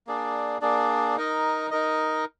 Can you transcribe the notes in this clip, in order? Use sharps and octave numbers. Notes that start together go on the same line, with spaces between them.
A#3 D4 G#4 D5
A#3 D4 G#4 D5
D#4 A#4 D#5
D#4 A#4 D#5